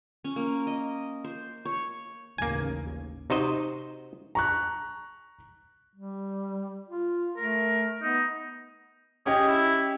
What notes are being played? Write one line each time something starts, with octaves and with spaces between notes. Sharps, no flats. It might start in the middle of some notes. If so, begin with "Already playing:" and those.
C#4
A#3
D#5
C5
C#5
A1 D#2 C#3 A#3 G#5
C3 D#4 F#4 C5 D#5
A#5 C#6 F#6
G3
F4
A3 A#4
B3 D#4
C#4 G4 G#4 D#5
E4